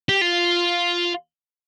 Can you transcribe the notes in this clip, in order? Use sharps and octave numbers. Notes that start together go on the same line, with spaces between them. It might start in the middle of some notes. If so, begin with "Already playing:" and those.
G4
F4